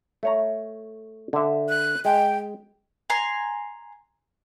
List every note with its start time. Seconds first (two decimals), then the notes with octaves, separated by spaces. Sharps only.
0.23 A3 C#5 A#5
1.33 D3 E5
1.69 F#6
2.05 G#3 G5
3.10 G#5 A#5 C6